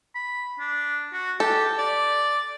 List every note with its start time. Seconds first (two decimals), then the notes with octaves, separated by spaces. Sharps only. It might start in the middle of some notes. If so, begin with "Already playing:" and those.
0.15 B5
0.59 D4
1.13 F#4
1.40 G4 A4
1.78 D5